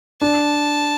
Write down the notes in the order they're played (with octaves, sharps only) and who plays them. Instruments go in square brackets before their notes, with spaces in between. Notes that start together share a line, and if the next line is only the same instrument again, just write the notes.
[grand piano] D4 [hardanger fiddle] A5